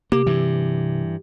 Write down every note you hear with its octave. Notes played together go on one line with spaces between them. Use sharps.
C3 A#3 G4
G2 E3